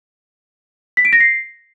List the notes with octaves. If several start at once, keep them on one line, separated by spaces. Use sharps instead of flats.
B6
D7
A#6
C7